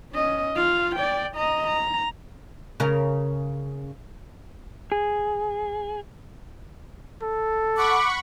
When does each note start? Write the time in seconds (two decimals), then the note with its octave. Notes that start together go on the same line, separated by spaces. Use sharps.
0.13 C#4 D#5
0.56 F4 F5
0.96 D5 G5
1.36 D#5 A#5
1.67 A#5
2.80 C#3 A#4
4.92 G#4
7.23 A4
7.77 F#5 B5 C#6 D6